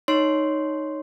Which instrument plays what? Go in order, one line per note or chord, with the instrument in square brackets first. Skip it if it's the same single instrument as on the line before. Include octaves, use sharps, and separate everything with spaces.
[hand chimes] D#4 C#5 C6